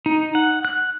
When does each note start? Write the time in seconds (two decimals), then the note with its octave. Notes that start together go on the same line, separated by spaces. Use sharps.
0.06 D#4
0.35 F#5
0.65 F#6